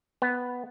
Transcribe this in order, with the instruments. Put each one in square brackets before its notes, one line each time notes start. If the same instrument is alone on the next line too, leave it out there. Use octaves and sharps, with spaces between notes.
[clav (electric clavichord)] B3